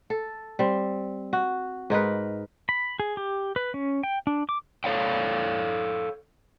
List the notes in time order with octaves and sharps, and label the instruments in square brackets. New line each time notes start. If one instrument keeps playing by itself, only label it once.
[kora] A4
G3 C4
F#4
G#2 D#4 A#4 B4
[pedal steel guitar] B5
G#4
G4
B4
C#4
G5
D4
D6
[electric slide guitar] A4 C#5 F5 G5